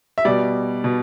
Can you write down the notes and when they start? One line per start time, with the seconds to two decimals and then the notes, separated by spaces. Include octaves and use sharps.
0.18 E5
0.25 B2 G3 D5
0.84 B2